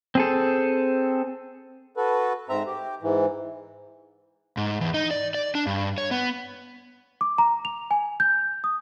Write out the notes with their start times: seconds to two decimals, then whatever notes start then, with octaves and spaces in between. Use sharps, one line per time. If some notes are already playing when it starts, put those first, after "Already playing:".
0.15 C4 G#4 A4
1.97 F#4 A4 B4
2.49 G#2 C4 E5 A#5
2.67 G4
3.02 G#2 E3
4.57 G#2
4.81 E2
4.94 D#4
5.11 D5
5.34 D5
5.55 D4
5.66 G2
5.98 C#5
6.11 B3
7.21 D6
7.38 A#5
7.65 F7
7.91 G#5
8.20 G6
8.64 D#6